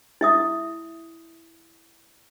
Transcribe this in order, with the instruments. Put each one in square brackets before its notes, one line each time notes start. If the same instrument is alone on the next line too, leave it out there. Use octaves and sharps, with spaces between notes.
[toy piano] E4 E5 D#6